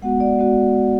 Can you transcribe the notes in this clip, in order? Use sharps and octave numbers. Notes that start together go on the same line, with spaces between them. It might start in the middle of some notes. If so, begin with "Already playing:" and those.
G#3 B3 F#4 F#5
D5
G#3 B3 F#4